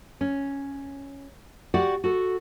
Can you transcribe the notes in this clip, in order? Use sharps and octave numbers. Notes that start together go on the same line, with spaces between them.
C#4
F#4 G4 D5 F#5
F#4 A4